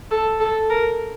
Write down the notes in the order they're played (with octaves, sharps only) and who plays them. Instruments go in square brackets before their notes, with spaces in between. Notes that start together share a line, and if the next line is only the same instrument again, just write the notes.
[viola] A4
A4
A#4